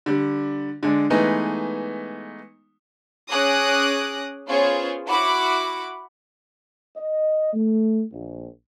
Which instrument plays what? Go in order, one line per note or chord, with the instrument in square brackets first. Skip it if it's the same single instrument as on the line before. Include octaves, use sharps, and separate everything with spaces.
[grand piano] D3 G3
D3 G#3 D4
E3 G#3 A3 B3 D#4
[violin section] C#4 G#4 D6 D#6 F#6 A#6
B3 C#4 F4 G#4 C5 C#5
E4 F#4 F#5 B5 D6
[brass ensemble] D#5
A3
A#1